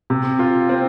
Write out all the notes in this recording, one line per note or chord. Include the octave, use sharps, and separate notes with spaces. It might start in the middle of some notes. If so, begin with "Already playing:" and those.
C3
F4
C4